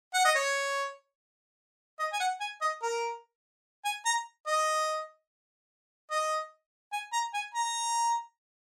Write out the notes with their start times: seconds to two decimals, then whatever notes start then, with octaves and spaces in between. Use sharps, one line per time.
0.14 F#5
0.25 D#5
0.35 C#5
1.99 D#5
2.13 G#5
2.20 F#5
2.40 G#5
2.62 D#5
2.82 A#4
3.85 G#5
4.06 A#5
4.47 D#5
6.11 D#5
6.93 G#5
7.13 A#5
7.34 G#5
7.54 A#5